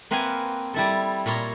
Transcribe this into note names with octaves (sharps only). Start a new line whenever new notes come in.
A#3 C4 B4 F5 F#5 G#5
G3 E4 A4
A#2 C#5 A#5 C6